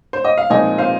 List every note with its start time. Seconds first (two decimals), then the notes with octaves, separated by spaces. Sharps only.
0.13 C5
0.24 D#5
0.38 F5
0.50 A#2 F3 G#3 C4 D#4 D#5 G#5
0.78 C5 F5